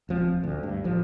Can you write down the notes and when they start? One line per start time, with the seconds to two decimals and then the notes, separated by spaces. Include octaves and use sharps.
0.09 D#1 F3 C4
0.44 D2
0.63 G2
0.84 A1 F3